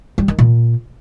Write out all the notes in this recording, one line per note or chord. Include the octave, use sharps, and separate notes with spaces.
G3
D#3
A#2